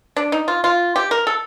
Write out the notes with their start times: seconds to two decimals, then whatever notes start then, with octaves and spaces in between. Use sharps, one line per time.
0.16 D4
0.32 D#4
0.48 F4
0.64 F4
0.96 G4
1.11 A#4
1.27 A4